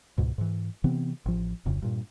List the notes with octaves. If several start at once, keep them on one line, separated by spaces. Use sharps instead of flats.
C#2 G#2 B2
G#2 E3
C3 E3 B3 C4
A1 F3
D1 F2 C#3
G2 A#2